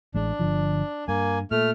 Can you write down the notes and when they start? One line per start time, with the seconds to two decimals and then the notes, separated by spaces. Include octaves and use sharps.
0.14 A1 G#3 D4
0.39 G1 D3 F3
1.08 G2 A#3 G#5
1.51 A#2 A3 F6